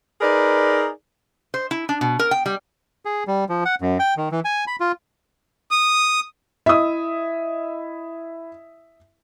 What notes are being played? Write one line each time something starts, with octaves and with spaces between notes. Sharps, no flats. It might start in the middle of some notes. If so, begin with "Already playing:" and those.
D#4 G#4 A#4 B4 D5
C5
E4
D4
B2
A#4
G5
G3
G#4
G3
F3
F#5
F#2
G5
D#3
E3
G#5
B5
F4
D#6
E4 D#5 E5 D#6